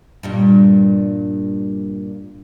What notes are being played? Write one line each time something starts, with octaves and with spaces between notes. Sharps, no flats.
G2 A#2 G3